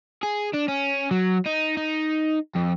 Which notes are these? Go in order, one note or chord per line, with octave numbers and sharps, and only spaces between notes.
G#4
D4
C#4
F#3
D#4
D#4
F2